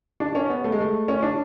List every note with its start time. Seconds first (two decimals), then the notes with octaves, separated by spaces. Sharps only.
0.20 D4
0.35 C#4
0.50 B3
0.64 A3
0.72 G#3
0.81 A3
1.08 C#4
1.23 D4